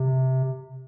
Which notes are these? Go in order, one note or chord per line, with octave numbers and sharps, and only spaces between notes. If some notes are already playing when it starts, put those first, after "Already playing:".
Already playing: C3